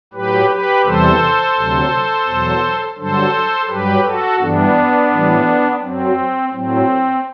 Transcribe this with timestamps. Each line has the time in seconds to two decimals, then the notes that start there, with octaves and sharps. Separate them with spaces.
0.14 A2 F#3 G4 B4
0.49 G4 B4
0.84 E2 C3 E3 G3 A4 C5
1.56 D2 C3 F#3
2.27 E2 B2 F#3
2.97 G2 D3 F#3 A4 C5
3.68 G2 F#3 G4 B4
4.04 F#4 A4
4.39 G2 E3 G3 B3 D4
5.11 A2 E3 G3
5.81 F#2 F#3 C4
6.52 A2 F#3 C4